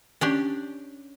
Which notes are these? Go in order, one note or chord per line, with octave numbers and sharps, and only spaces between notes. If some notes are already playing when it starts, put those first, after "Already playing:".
C#4 D4 G4